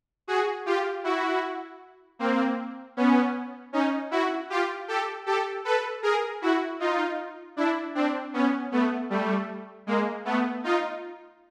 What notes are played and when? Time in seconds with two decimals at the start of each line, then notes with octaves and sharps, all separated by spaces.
0.27 F#4 G#4
0.66 F4 G4
1.04 E4 F#4
2.19 A#3 C4
2.97 B3 C#4
3.73 C#4 D#4
4.11 E4 F#4
4.50 F4 G4
4.88 G4 A4
5.26 G4 A4
5.65 A4 B4
6.03 G#4 A#4
6.42 E4 F#4
6.80 D#4 F4
7.57 D4 E4
7.95 C4 D4
8.33 B3 C#4
8.72 A3 B3
9.10 G3 A3
9.87 G#3 A#3
10.25 A3 B3
10.64 D#4 F4